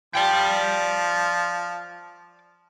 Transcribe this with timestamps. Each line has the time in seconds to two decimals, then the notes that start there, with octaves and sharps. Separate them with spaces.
0.15 F3 D5 G5